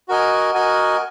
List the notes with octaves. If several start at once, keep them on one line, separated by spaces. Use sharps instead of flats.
F#4 A#4 D#5 G#5
F#4 A#4 D#5 G#5